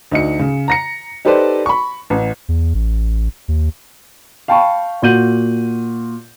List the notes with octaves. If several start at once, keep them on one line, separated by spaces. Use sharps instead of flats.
D2 D#4 C#7
C#3
A#5 A#6 C#7
D#4 G4 A4 B4 C5 D5
B5 C#6
A1
E2
A1
D#2
F5 G5 A5 B5 C#6
A#2 F#4 G6 D#7 F#7